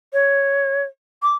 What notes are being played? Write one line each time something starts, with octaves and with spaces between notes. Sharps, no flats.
C#5
D6